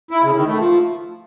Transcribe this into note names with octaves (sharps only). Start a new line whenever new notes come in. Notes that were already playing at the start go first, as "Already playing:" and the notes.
E4
C#3
D#3
A3
F3